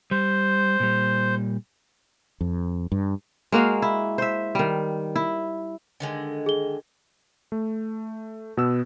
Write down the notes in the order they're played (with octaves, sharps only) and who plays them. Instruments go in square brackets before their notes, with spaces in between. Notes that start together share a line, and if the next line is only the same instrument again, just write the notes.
[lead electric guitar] G3 [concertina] C5
[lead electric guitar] A#2 G3
[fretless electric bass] F2
G2
[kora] G#3 A#3 F#4 F5
E4
C5 E5
D#3 G3
E4
[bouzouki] D3 D#3 G#3
[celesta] G#4 G7
[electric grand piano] A3
B2 B3 E6